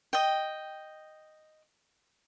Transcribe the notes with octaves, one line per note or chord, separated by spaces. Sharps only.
D#5 G5